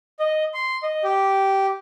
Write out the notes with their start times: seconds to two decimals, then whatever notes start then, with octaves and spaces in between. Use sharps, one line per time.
0.19 D#5
0.54 C6
0.83 D#5
1.04 G4